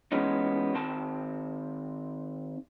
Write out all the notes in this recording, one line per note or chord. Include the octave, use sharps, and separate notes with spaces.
E3 G#3 B3 C#4 D#4
D#3 C4 A5